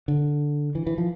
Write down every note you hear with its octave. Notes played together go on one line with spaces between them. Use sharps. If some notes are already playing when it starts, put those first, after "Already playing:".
D3
E3
E3
F3